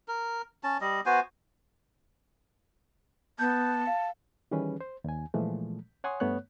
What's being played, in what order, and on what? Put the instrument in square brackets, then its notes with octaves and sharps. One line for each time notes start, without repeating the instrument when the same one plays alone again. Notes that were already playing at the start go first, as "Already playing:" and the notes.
[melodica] A#4
C#4 A5
G3 D#5
B3 F#4 C5 G#5
[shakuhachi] B3 [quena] A5 [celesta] G6
[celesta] F5
[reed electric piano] D#3 E3 G3 C#4 G#4 B4
C5
D#2 G#5
A#2 E3 F3 G#3 A3
C#5 F#5 G#5 C6 C#6 D#6
G2 A3 B3 C#5 F#6